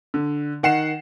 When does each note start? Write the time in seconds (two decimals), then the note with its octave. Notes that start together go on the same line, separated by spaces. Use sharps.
0.14 D3
0.63 D#3 F#5 C7 E7